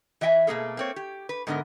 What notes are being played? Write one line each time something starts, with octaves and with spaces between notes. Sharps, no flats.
E3 D#5 E5 G5 G#5
B2 A3 A#3 G#4 A4
A#3 C4 C#5
G4
B4
G#2 D3 B3 A#4 D#5